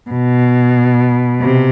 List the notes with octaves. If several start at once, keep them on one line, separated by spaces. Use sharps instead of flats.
B2
C3